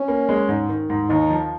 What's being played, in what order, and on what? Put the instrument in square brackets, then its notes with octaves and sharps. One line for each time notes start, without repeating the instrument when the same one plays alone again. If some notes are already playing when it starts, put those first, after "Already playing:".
Already playing: [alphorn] C#4
[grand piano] A#3
G#3
G#2
D#3
G#2
[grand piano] D#2 [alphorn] D#4
[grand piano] F3